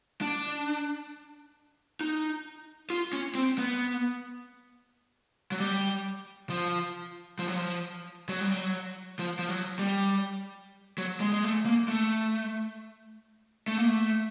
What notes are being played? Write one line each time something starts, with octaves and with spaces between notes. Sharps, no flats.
D4
D#4
F4
C#4
C4
B3
F#3
G3
F3
F3
F#3
F3
F#3
G3
F#3
F3
F3
F#3
G3
F#3
G#3
G#3
A3
A#3
A3
A3
A#3
A3